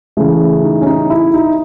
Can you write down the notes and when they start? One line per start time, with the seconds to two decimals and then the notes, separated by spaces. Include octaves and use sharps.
0.17 C#3 E3 A3
0.64 D#4
0.82 C#4
0.86 D#4
1.10 E4
1.34 D#4